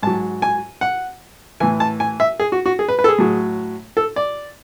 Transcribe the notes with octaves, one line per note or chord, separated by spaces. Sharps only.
G#2 F#3 A5
G#5
F#5
A2 E3 G#5
A5
G#5
E5
G#4
F#4
F#4
G#4
B4
B4
A4
G#4
A2 F#3
A4
D5